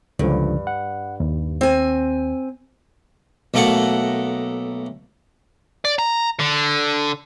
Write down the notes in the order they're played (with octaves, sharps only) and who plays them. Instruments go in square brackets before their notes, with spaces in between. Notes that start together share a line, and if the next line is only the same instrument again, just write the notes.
[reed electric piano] C#2 D3 F3 [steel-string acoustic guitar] G2
[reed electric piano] F#5
D#2
[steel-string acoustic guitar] C4 G#5
[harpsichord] B1 A3 A#3 A4 F#5
[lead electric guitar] D5
A#5
D3